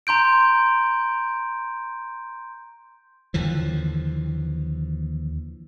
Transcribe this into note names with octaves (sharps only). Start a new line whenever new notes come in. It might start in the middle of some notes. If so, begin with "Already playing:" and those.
A#5 C6 G6 D7
D#2 D3 E3 F3